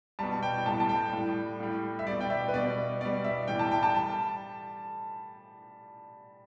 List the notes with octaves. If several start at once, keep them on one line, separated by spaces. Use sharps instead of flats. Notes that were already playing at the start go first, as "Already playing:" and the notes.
B2 G3 A5
G5
A2 G3 A5
A5
G5
A2 G3
A2 G3
E5
B2 G3 D5
G5
E5
B4
B2 G3 D5
B2 G3 D5
E5
A2 E3 G3 G5
A5
G5
A5
G3 A5